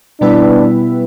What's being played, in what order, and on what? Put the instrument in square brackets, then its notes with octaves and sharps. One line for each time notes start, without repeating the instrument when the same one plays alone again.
[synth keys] B2 G3 B3 E4 B4 [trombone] D4